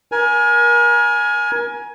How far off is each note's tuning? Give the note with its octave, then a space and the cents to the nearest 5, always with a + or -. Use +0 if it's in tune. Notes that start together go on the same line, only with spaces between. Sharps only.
A#4 +30 G#5 +10